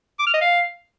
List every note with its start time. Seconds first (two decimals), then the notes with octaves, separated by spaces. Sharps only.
0.19 D6
0.26 F6
0.34 D#5
0.41 F5